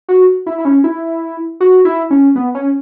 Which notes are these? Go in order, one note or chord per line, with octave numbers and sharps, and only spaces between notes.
F#4
E4
E4
C#4
E4
F#4
E4
C#4
B3
C#4